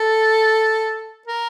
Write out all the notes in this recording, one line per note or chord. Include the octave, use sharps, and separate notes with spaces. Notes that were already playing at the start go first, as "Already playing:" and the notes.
Already playing: A4
A#4